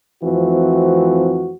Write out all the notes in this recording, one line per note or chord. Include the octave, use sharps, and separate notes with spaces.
F2 E3 F3 A3 C4 F#4